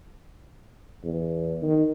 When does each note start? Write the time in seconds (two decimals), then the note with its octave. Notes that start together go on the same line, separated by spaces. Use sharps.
1.04 E2
1.62 D#3